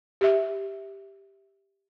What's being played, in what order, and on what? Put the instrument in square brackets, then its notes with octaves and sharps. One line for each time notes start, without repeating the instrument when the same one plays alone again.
[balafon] G4 E5